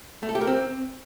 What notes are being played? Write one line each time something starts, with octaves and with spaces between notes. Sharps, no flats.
A3
A4
G4
A#4
C4